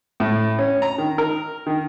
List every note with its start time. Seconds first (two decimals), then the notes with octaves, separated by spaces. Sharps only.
0.20 A2
0.59 C#4
0.82 A#5
0.98 D#3
1.18 A#4
1.67 D#3